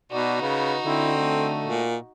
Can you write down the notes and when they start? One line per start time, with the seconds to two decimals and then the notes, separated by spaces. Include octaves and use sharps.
0.12 B2 D#4 F#4 D5
0.41 C#3 B4
0.85 D3 C4 E4
1.20 A3
1.66 A#2